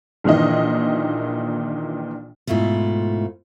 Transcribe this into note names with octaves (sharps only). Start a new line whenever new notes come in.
A#1 A#2 D#3 E3 D#5
G#2 B2 A3 E4 F4